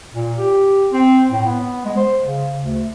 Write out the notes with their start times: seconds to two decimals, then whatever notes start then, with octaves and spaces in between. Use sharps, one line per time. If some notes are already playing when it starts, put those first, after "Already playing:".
0.14 A#2
0.38 G4
0.92 C4
1.31 A2
1.46 B3
1.85 G#3
1.97 C5
2.25 C#3
2.61 D2